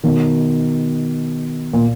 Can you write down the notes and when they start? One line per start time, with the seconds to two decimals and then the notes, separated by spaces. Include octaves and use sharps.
0.04 B2 D#3
1.73 A#2